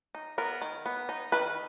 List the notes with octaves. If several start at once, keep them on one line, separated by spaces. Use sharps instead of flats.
D#4
B3 A#4
D#3
B3
D#4
D#3 B4